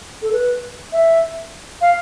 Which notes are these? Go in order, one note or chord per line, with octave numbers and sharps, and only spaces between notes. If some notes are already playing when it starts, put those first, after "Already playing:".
A4
B4
E5
F5